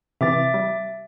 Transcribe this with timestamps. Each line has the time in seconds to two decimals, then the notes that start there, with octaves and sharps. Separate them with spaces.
0.21 C3 E3 E5 D6 A6
0.54 G3